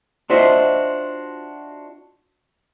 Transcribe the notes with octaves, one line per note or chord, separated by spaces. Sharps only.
D4 F4 F#4 C5 D#5 E5